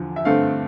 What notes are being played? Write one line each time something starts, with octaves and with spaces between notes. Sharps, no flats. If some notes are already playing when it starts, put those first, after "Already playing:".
Already playing: E2 D3 F3
E5
G2 D3 A3 C4 F5